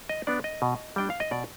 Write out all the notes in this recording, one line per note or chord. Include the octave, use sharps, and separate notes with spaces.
D#5
B3 D4 D5
D#5
B2
G3 D4 G5
F5
D#5
B2 D5